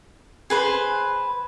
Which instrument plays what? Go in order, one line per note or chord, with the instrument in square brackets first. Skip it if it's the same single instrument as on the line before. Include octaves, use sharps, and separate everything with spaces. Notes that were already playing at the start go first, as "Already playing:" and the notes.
[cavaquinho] G#4 B4 C5